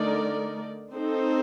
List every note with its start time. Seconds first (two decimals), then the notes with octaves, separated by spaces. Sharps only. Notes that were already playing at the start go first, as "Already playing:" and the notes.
Already playing: D3 A3 D#4 A#4 D5
0.93 C4 D#4 A4 C5